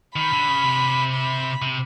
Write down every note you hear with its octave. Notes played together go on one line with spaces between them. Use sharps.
D#3 B5
D3
C#3
C3
B5
C3